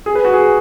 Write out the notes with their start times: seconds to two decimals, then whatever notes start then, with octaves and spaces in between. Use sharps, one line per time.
0.06 G#4
0.15 B4
0.25 F#4
0.33 G#4